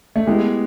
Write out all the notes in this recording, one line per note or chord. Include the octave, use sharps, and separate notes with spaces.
A3
G#3 B3 E4 G4